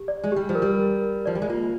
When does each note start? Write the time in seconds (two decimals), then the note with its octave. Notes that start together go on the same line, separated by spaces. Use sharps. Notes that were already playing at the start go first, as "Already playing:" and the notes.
Already playing: G4
0.08 D5
0.24 G#3
0.32 G3 G4
0.49 F3
0.55 A#4
0.62 G3
0.79 A#4
1.02 A#4
1.26 F3 D5
1.35 G3
1.42 G#3
1.50 A#3 F4